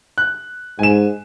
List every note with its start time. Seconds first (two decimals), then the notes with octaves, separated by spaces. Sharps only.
0.18 F#6
0.79 G#2 G#5 E7